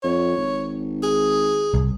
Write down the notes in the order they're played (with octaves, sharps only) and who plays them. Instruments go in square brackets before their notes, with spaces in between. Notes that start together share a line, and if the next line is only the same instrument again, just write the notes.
[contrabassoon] F2 [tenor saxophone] C#5
[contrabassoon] G#1
[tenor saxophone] G#4
[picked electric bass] C2